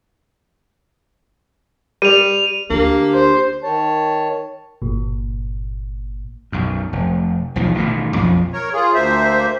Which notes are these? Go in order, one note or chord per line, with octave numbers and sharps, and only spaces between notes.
G3 D#7 F7
D2 A#3 D4 G4
C5
D#3 C#5 A5
G1 A#2
B1 F#2
F1
B1 E2 D#3 F3
A1 G2 B2 D#3
B1 F2 F3
A#4 C#5
F4 G#4
D2 A#3 C5 E5